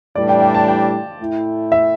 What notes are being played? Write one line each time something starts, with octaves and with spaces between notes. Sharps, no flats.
A2 E3 G3 D4 D5
G5
G5
A5
G5
A2 A3 E4
E5